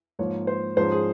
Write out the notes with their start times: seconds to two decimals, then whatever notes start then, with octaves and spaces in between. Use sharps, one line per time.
0.19 G#2 F3 A#3 C#5
0.47 C5
0.77 G#2 F3 G#3 C#4 C5
0.92 G#4